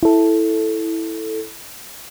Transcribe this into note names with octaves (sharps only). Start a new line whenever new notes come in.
E4 A4